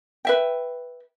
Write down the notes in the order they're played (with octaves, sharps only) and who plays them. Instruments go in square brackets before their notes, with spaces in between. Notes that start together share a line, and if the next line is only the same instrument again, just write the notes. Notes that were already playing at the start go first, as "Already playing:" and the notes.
[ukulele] B4 E5 G5